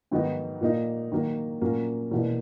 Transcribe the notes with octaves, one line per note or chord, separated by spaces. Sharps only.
G#2 D#3 F#3 B3 D#4
A#2 A#3 D#4
D#3 F#3 A#3
A#2 F#3 A#3 C#4
E2 B2 A#3